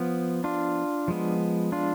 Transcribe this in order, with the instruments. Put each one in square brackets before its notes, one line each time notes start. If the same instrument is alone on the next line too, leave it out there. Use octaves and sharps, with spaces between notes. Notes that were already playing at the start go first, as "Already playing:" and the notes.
Already playing: [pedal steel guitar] F3 B3
D4 F4
F3 G#3 B3
D4 F4